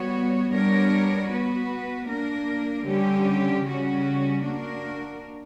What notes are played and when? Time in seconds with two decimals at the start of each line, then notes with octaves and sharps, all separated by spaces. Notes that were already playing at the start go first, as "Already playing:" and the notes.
Already playing: G3 B3 F#4 C#5
0.52 G3 B3 D4 A#4 C#5
1.30 B3 F#4 B4
2.08 A#3 D4 A#4
2.86 D3 G3 C#4 G4
3.65 C#3 G3 C#4 F#4
4.43 A#3 D4 F#4 A#4